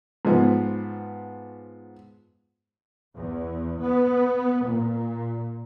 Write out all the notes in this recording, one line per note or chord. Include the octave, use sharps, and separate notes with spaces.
G#2 F3 B3
E2
B3
A#2